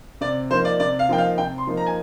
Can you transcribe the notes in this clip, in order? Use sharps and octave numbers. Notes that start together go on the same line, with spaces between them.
C3 D5
F3 A#3 D#4 C5
D5
C3 D5
F5
F3 A#3 D#4 G5
F5
C3 G5
C6
F3 A#3 D#4
A#5
G#5